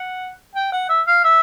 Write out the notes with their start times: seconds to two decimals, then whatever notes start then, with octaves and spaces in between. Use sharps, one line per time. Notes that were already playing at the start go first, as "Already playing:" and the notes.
Already playing: F#5
0.55 G5
0.72 F#5
0.89 E5
1.07 F5
1.24 E5